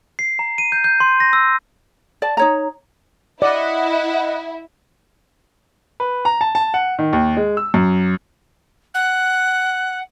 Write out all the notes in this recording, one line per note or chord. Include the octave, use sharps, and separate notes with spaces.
C7
A#5
D#7
G6
G6
C6
A#6
E6
D5 A5
D#4 C#5 A#5
E4 D5 D#5 F#5
B4
A#5
A5
A5
F#5
D#3
D#2
G#3
E6
F#2
F#5 F#6